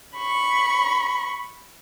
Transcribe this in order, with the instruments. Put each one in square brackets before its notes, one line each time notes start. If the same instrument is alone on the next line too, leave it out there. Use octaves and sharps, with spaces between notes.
[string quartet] B5 C#6